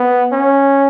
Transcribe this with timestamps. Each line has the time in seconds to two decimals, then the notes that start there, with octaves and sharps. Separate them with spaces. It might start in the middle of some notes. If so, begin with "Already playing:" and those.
Already playing: B3
0.32 C#4